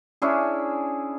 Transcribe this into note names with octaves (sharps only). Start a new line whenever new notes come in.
C#4 D4 E4 G#4